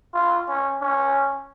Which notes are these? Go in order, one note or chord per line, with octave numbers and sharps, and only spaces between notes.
F4
C#4
C#4